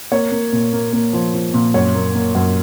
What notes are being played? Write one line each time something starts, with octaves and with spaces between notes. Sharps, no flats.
A#3 C#5
A#3
A#2
A#3
A#3
F3
F3
A#2
F#2 C#5
A#3
A#3
F#2